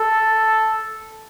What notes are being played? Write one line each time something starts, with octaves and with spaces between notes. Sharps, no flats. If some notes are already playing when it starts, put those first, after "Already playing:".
Already playing: A4